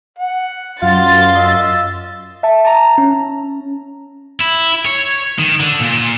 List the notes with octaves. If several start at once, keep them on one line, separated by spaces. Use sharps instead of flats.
F#5
F#2 F4 C6 A6
D#5 E6
E5 A5
A5 A#5
C#4
E4
C#5
D#3
D3
A#2